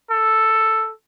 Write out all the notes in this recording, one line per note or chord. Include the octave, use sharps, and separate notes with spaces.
A4